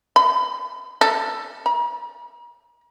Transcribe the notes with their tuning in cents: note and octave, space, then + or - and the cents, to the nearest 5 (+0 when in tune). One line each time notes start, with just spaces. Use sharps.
B5 +25
A4 +10
A#5 +40